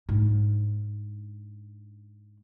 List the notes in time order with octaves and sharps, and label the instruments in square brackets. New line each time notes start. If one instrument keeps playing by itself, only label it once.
[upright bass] G#2 D4